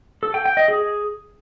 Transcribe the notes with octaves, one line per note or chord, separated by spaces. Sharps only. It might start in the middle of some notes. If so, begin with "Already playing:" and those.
A4
G5
G5
D#5
G#4